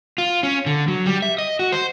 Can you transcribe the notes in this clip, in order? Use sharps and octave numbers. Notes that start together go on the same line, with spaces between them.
F4
C#4
D3
F#3
G3
E5
D#5
F#4
C5